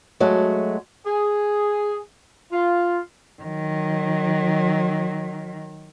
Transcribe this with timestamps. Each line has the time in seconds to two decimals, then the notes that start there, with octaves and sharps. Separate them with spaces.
0.20 F#3 G#3 A3 F#4
1.06 G#4
2.52 F4
3.42 D#3 F#3